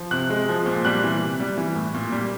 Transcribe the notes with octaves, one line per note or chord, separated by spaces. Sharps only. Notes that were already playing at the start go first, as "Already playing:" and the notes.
Already playing: F3
C3 F#6
G#3
F3
A#2
G3 F#6
E3
C3
G3
E3
A2
A#2
G3